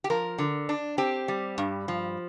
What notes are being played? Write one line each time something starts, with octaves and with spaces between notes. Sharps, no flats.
G4
F3 A#4
D3
D4
C4 G4
G3
G2
F3